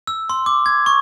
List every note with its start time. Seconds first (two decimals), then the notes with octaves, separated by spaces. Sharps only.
0.07 E6
0.30 C6
0.46 D6
0.66 G#6
0.86 C#6